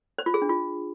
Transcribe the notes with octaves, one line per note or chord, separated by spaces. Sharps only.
C5
F4
G#4
D4
F4